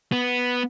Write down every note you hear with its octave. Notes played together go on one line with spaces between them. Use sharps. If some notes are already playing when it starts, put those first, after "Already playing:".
B3